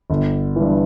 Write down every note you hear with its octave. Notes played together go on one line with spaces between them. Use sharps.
G1
G2 E3